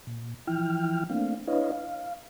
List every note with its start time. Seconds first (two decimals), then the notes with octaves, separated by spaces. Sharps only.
0.07 A#2
0.47 E3 F3 E4 G5 F6
1.10 A3 A#3 C4 D4 F5
1.47 D4 E4 B4 C#5 D#5 F5
1.72 F5